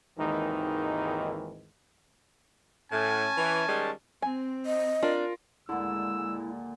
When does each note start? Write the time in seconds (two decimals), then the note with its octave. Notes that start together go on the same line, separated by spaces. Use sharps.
0.18 G#1 D#2 G#2 D#3 E3 D#4
2.92 A2 C#4 G#5 A5
3.38 E3
3.68 D#3 G3 G#3
4.22 C4 G#5
4.66 D#5
5.03 D4 F4 A#4
5.69 D#2 A#2 D3 G#3 E4 E6